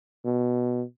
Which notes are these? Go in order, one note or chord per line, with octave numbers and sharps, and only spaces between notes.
B2